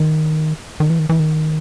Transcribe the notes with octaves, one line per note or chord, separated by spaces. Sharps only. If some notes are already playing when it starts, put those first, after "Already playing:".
Already playing: D#3
D#3
E3
D#3
E3
D#3